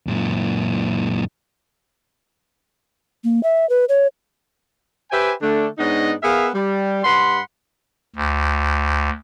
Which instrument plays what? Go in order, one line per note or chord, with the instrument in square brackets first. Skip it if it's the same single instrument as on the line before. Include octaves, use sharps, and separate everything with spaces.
[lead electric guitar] F#2 A#2
[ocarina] A#3
E5
B4
C#5
[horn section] G4 B4 C5 E5 G5 G#5
D3 A3 D4
G#2 B3 D4 D#4 C#5 D#5
B3 G#4 A#4 E5 F5
G3
G2 F#5 B5 C6
[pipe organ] D2